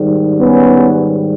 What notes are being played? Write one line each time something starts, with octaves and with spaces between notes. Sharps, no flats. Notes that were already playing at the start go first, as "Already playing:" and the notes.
Already playing: G#2 D#3 G3
B3 C#4